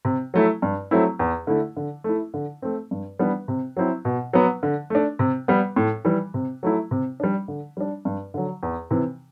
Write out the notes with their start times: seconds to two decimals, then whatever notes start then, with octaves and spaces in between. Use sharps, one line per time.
0.05 C3
0.34 F#3 A3 E4
0.62 G2
0.91 F#3 A3 C4 E4
1.19 E2
1.47 D3 A3 E4
1.77 D3
2.04 A3 E4
2.34 D3
2.62 A3 C4
2.91 G2
3.19 E3 G3 B3 D4
3.48 C3
3.77 F#3 C4 E4
4.05 B2
4.33 F#3 B3
4.63 D3
4.90 A3 D4
5.19 C3
5.48 G3 B3
5.76 A2
6.05 E3 G3
6.34 C3
6.63 F#3 A3 E4
6.91 C3
7.20 G3 D4
7.48 D3
7.77 G3 D4
8.05 G2
8.34 D3 F#3
8.63 E2
8.91 C3 E3